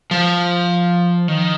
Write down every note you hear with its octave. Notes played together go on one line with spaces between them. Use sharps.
F3
D#3